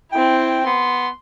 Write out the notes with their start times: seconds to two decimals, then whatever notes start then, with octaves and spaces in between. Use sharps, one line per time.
0.12 C4 E4 G5
0.66 B3 C6